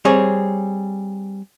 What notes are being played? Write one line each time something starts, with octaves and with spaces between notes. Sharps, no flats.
G3 C4 G#4 C#5